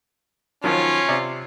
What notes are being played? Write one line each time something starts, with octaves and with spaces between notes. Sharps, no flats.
D#3 F3 F#3 C#4 F4
C3 D5